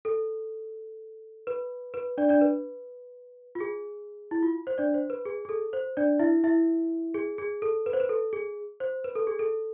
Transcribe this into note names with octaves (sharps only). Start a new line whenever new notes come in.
A4
B4
B4
D4 D5
D4 D5
B4
F4
G#4
E4
F4
C5
D4 D5
C5
B4
G#4
G#4
A4
C5
D4 D5
E4 E5
E4 E5
G#4
G#4
A4
B4
C5
B4
A4
G#4
C5
B4
A4
G#4
A4